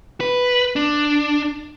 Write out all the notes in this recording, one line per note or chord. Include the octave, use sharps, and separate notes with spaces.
B4
D4